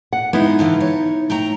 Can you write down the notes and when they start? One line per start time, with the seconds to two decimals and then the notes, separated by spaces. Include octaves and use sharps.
0.13 F#5
0.33 G#3 B3 D#4 E4 D#5
0.59 D3 E3 F4
0.80 C#5
1.30 A3 G5 A#5